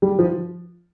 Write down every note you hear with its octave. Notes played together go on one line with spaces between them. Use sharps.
G3
F3